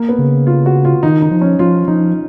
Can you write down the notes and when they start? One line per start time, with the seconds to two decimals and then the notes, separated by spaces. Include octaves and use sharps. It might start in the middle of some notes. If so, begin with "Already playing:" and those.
Already playing: A#3
0.09 B3
0.19 C#3
0.47 F4
0.66 F#4
0.85 F4
1.03 D#3 D#4
1.22 D#4
1.31 F3
1.42 C#4
1.59 F3 F4
1.88 F3 D#4